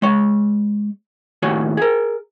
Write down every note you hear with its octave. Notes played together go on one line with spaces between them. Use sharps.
G#3 C#5
D#2 A2 F#4 C#5 G#5
G#4 A#4